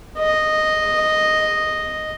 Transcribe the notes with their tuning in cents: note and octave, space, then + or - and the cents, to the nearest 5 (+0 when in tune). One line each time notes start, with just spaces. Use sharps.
D#5 -5